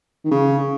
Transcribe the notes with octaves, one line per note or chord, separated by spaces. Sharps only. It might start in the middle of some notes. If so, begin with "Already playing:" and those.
D#3
C#3